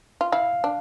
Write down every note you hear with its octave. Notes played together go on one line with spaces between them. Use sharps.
F4
E4 F5
D4